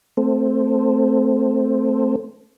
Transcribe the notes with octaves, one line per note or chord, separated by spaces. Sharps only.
A3 C4